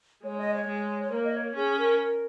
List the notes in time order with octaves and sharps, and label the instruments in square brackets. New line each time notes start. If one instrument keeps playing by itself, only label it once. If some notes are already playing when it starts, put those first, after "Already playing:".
[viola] G#3 [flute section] C#5
[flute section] D#5
C#5
[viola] G#3
[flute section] C#5
[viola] A#3 [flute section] A#4
[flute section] D#5
C#5
[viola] C#4 [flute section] G#4
[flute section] A#4
A#4